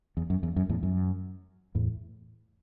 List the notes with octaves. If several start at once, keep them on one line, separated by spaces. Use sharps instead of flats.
E2
F#2
E2
F#2
E2 A2
F#2
E2 A2